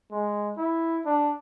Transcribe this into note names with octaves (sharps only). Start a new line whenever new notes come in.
G#3
E4
D4